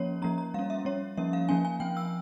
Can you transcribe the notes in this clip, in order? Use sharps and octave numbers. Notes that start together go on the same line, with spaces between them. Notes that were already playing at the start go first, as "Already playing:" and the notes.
Already playing: F3 A#3 C#4 C#5
F3 A#3 C#4 A#5
A#5
G3 C#4 F5
E5
G3 C#4 C#5
F3 A#3 C#4 E5
F5
F3 A#3 C#4 G#5
G#5
F3 C4 G5
E6